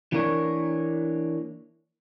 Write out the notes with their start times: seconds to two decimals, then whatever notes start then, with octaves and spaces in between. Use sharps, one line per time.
0.12 E3 A#3 D4 A#4 C#5